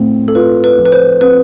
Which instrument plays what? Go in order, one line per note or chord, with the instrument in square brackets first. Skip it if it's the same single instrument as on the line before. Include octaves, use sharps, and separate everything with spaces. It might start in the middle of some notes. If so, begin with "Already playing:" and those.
Already playing: [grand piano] A2 C4
[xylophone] A4
[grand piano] F4 [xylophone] B4
[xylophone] B4
[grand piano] F3
[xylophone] B4
C5
[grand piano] C4 [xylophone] B4